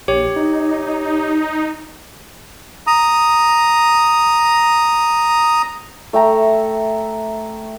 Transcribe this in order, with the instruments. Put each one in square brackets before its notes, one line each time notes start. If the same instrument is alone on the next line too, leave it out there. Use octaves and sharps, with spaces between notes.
[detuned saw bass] A#1 [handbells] G4 C#5
[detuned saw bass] D#4
[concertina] A#5 D#6
[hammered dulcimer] A3 E5 G5 A#5